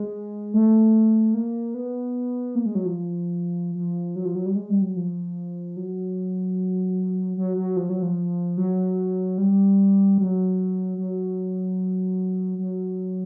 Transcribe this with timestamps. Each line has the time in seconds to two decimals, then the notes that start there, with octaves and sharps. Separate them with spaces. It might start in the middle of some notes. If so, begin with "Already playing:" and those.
Already playing: G#3
0.54 A3
1.34 A#3
1.74 B3
2.55 A#3
2.66 G#3
2.75 F#3
2.86 F3
3.75 F3
4.16 F#3
4.25 F3
4.35 F#3
4.46 G3
4.56 G#3
4.69 G3
4.82 F#3
4.96 F3
5.77 F#3
7.37 F#3
7.57 F#3
7.76 F3
7.89 F#3
8.02 F3
8.57 F#3
9.38 G3
10.18 F#3
10.98 F#3
12.58 F#3